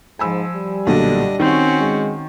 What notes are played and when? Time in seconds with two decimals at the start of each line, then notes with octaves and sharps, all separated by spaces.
0.19 G#2 F3 G#5 B5 E6
0.55 G3
0.87 B1 A#2 D3 D4 D#5
1.40 D#3 C4 C#4 F#4
1.80 G#3